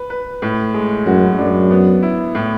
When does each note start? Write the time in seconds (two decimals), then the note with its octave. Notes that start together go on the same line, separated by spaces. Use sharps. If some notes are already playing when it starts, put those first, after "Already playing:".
Already playing: B4
0.10 B4
0.42 A2
0.74 G#3
1.06 F#2 F#4
1.38 F#2 D4
1.71 B3
2.03 E4
2.35 A2